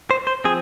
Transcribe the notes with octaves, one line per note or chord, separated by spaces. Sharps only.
C5
C5
F3 C4 G#4